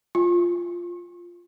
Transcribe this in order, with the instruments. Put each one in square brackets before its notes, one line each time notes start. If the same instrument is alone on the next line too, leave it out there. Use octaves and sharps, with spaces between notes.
[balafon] F4